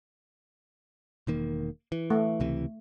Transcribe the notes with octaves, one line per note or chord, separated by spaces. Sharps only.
E1 D#3 A#3
E3
A3
C#2 C3 E3